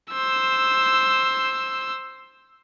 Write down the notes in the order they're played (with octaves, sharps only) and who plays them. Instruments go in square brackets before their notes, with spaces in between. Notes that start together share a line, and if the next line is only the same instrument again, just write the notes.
[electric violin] C5 E6